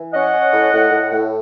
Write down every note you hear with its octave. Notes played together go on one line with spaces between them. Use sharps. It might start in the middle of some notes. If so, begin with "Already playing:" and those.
Already playing: E3
C#4 D#5 F#5
C#4
A2
A2
A2
A2